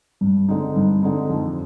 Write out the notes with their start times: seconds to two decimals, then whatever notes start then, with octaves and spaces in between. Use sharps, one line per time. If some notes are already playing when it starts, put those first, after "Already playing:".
0.21 G2
0.49 D3 G#3 C4 D#4
0.76 G2
1.03 D3 G#3 C4 D#4
1.30 F2